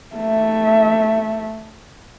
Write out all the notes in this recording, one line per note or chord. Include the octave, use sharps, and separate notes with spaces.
A3 E5